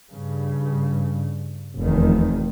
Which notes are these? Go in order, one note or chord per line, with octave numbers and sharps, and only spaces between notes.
G2 C#3
F1 E2 D#3